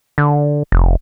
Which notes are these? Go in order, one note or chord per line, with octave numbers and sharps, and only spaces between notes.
D3
F1